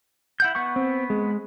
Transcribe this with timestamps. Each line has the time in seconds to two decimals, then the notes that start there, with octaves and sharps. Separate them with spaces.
0.40 E4 F#5 G6
0.55 B3 F#5 C#6
0.76 C4
1.10 G#3